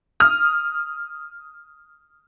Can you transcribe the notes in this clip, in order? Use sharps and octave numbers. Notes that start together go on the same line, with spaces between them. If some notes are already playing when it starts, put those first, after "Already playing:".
D#6 F6